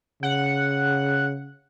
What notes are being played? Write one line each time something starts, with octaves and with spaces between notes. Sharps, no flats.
C#3 F#5